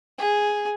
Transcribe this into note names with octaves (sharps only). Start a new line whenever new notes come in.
G#4